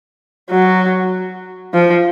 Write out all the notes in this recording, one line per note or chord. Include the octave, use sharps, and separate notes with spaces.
F#3
F3